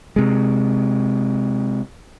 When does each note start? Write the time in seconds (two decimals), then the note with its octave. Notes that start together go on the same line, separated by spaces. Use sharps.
0.16 C3 G#3